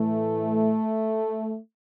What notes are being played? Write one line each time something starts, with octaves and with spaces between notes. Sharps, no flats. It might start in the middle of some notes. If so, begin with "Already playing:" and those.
Already playing: A2 E3 A3